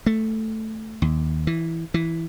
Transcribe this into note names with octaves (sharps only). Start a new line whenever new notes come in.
A3
D#2
E3
E3